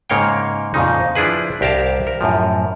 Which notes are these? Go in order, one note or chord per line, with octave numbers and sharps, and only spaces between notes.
G#2 C#3 A#3 C#5 F5 G5
F2 A#2 C#3 D#4
F3 D4 E4 G#4 B4
C2 G4 A#4 F5 A5
A#4
F#2 A2 F3